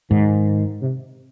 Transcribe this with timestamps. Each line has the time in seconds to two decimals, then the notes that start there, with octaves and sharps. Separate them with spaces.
0.10 G#2 D#3
0.81 C3